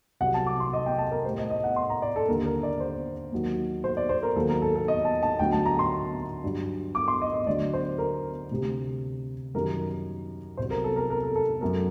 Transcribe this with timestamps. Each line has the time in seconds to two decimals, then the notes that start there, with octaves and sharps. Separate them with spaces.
0.20 C2 C3 F#3 F#5
0.34 A5
0.47 D6
0.60 C6
0.73 D#5
0.86 G5
0.99 A5
1.11 A#4
1.25 G3 C5
1.28 A2
1.38 D#5
1.50 D#5
1.64 F#5
1.76 C6
1.90 A#5
2.02 D5
2.16 A4
2.28 D#2 D3 G3 A#4
2.46 A#4
2.63 D5
2.80 C5
3.32 D#2 D#3 F#3
3.84 C5
3.97 D5
4.09 C5
4.23 A#4
4.36 D#2 D#3 F#3 A4
4.49 A#4
4.62 A4
4.75 A4
4.88 D#5
5.05 A5
5.23 A5
5.39 D2 D3 F#3 G5
5.52 A5
5.65 A#5
5.79 C6
6.43 G2 F#3
6.95 D6
7.08 C6
7.22 D#5
7.34 D#5
7.47 D2 D3 F#3 D5
7.73 C5
7.98 A#4
8.51 D2 C3 G3
9.54 F#2 D#3 G3 A#4
10.57 C2 C3 F#3 C5
10.71 A#4
10.84 A4
10.96 A#4
11.10 A#4
11.23 A4
11.35 A4
11.61 F#2 F#3 A#4